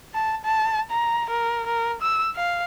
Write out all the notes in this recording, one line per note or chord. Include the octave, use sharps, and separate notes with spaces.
A5
A5
A#5
A#4
A#4
E6
F5